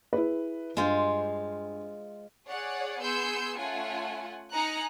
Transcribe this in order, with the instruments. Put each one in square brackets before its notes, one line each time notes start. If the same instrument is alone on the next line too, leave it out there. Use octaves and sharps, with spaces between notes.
[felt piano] E4 G#4 B4
[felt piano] G2 [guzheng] G#3 F4 C5
[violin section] G#4 C#5 D5 F#5
B3 G#4 C6 E6 G6 C#7
A3 C#4 F4 F#5 G#5
D#4 G#5 A#5 F#6 C#7